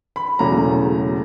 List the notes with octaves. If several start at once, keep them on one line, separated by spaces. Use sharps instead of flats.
B5
E1 E2 C#3 F#3 A3 A#5